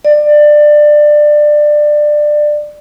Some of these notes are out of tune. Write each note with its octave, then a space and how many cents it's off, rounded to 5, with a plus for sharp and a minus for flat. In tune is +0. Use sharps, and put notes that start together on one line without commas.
D5 +20